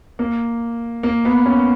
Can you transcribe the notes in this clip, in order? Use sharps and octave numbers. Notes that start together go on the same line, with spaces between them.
A#3
A#3
B3
C#4